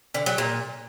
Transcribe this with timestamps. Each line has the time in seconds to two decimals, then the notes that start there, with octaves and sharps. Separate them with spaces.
0.14 D3
0.26 F#3
0.38 A#2